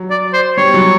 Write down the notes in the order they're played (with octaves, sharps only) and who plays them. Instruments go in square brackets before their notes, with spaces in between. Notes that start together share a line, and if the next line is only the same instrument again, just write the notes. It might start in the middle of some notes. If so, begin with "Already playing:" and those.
Already playing: [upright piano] F#3
[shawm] D5
C5
[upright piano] G3 [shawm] C#5
[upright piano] F#3